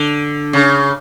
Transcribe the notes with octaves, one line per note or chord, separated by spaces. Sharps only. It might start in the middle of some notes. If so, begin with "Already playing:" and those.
Already playing: D3
C#3